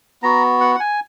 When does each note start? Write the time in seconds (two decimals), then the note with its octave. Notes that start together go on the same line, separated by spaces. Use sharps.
0.22 B3 F#4 A#5
0.61 F#5
0.75 F#5
0.80 G#5